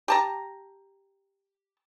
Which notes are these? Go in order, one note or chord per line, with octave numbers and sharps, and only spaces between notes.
G4 A5 A#5